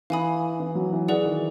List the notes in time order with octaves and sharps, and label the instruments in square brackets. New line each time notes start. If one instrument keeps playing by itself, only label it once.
[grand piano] E3 [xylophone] F5 G#5 B5 D#6
[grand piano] E3
F#3
E3
[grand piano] E3 [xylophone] G#4 B4 D5 F#5
[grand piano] D#3